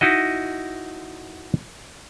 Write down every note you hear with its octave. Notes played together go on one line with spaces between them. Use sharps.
D#4 E4 F#4 D#5